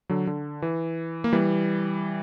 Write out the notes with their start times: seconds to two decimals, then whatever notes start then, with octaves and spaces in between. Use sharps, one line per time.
0.09 D3 F#3
0.27 D3
0.62 E3
1.24 A#3
1.33 E3 G3